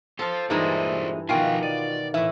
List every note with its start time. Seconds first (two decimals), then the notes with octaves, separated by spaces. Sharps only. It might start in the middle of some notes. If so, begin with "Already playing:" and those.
0.19 F4 A4 C5 F5
0.50 G2 A#2 E3 G#3 D4 D#4 C5
1.29 B2 D#3 F3 F4 F#4 F5 G5 G#5
1.63 D5 D#7
2.14 A2 E3 E5